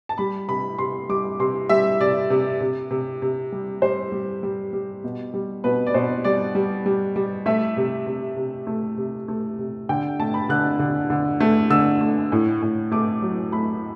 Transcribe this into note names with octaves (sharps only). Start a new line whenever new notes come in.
A5
G3 B5
C3 B5
C3 C6
G3 D6
C3 C6
G3 E5
C3 D5
C3
C3
C3
C3
G3
G3 C5
G3
G3
G3
B2
G3
B2 B4
D5
B2 C5
G3 D5
G3
G3
G3
A3 E5
C3
C3
C3
A3
C3
A3
C3
D3 G5
A3 A5
B5
D3 F#6
D3
D3
A3
D3 E6
A3
A2
A2
A3 D6
F#3
A3 B5